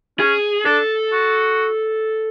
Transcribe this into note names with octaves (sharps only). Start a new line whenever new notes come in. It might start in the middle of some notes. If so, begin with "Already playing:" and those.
C#4 G#4
D4 A4
F#4